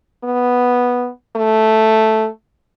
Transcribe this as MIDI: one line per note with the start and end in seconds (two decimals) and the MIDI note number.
0.24 1.09 59
1.36 2.27 57